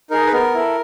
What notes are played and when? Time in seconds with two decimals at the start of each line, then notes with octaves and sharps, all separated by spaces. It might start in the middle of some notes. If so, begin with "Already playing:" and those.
0.10 D#4 G#4 A#4
0.27 B4
0.32 B3 A#4
0.54 E4 A4